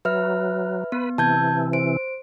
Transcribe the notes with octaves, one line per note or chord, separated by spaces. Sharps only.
F#3 B4 E5 F6
B3 B4
C3 E3 A5 G6 G#6
C5 D7